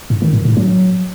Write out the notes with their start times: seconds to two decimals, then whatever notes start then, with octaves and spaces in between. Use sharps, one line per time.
0.10 G#2
0.22 D#3
0.33 G#2
0.45 A2
0.57 F#3